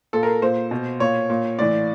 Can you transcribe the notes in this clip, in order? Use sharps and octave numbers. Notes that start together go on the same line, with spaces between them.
A#2 A4
A#4
A#2 C5
B2
A#2 C#5
A#2
A2 E3 D5